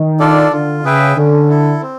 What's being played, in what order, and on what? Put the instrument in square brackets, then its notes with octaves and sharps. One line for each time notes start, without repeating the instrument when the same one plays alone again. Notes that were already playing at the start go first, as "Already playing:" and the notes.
Already playing: [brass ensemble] D#3
[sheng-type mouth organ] D4 F4 A4 D5
[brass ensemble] D3 [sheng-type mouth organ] F4
[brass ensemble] C#3 [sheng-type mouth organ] G#4 B4 E5 G5
[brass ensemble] D3 [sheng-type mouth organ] C#4
[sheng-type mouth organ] E4 A4
C4